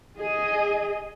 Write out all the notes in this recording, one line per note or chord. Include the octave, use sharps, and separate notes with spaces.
G#4 D#5